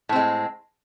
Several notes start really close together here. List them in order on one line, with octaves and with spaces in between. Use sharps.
A2 C4 G#3